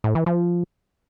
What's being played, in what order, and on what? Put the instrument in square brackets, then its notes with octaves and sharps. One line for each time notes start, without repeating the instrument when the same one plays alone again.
[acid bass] A2
E3
F3